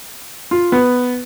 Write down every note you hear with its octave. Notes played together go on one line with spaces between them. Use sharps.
F4
B3